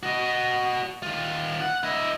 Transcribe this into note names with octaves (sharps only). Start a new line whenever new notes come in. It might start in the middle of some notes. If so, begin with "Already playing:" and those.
F#4 D#5
D#3 F4
F#5
E4 D#5